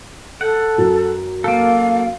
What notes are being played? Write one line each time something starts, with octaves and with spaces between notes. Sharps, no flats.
A4 F#5
F#2 F#3
A#3 A4 F5